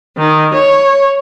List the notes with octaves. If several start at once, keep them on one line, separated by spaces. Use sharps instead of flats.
D#3
C#5